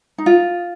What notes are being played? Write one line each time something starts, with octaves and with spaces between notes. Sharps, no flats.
D#4
F4